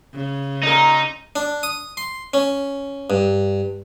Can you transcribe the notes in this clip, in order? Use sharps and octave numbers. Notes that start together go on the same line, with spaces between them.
C#3
A#2 D#4 A#4
D4
D#6
C6
C#4
G2